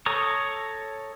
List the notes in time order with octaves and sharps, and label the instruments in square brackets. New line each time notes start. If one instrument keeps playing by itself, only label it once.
[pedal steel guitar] A4 C#5 A#5 C#6 D#6